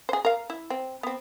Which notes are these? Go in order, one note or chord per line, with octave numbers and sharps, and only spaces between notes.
G#4 C5
A#4 F5
E4
C4
B3 C4